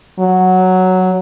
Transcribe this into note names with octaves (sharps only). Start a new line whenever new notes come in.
F#3